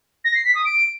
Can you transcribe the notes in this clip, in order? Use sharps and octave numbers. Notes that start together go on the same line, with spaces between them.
A#6
C7
B6
D#6
D7